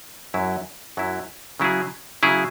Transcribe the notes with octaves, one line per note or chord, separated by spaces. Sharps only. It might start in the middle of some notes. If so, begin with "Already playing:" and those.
F#2 F#3 E4
F#2 F#3 E4
C#3 F#3 E4 G#4
C#3 F#3 E4 G#4